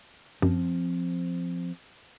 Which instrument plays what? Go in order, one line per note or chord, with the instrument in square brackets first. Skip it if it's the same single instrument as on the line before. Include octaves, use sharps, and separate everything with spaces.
[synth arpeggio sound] F#2 [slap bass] F3 C4